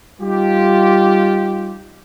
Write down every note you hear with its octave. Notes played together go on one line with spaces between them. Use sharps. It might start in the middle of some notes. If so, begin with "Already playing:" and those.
G3 D#4 F4 G4